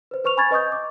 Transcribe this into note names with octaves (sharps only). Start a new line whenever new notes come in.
B4 C5
B4 C5 C#6 F6 F7
G#5 B5 C#6 F6 G#6 A6
B4 D#5 C#6 D#6 G6
D6